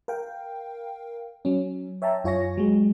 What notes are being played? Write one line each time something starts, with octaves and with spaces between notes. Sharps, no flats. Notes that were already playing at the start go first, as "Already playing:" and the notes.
A#4 F5 G5
F#3 C#4
C#5 E5 G5 A5 A#5
F#2 F4 C#5 G#5 C#6 A#6
F#3 G#3